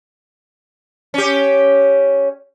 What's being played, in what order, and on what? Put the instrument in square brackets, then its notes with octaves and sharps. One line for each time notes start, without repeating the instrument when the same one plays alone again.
[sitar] C#4 G4